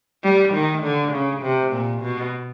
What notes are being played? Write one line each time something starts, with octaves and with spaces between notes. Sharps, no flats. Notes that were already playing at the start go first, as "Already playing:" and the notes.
G3
D#3
D3
C#3
C3
A#2
B2